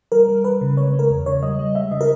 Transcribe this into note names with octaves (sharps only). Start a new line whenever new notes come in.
G3 A#4
G3
G3 B4
C#3
G#3 C#5
G#3
A#4
E2
C#3 C#5
G3 D#5
G3
G#3 E5
C#3 D#5
A#4